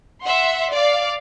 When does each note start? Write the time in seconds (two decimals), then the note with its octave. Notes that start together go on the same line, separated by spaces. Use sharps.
0.22 E5 F#5 C6
0.72 D5 F5